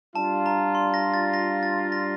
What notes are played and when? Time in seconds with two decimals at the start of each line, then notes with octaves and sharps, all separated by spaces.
0.15 G3 D4 F4 A5
0.46 A#5
0.75 C6
0.94 A#6
1.14 A6
1.34 A#6
1.63 A6
1.92 A#6